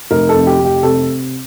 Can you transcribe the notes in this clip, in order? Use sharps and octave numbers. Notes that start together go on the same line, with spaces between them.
F1 A#4
F2 A4
G4
F1
G4
C3 A4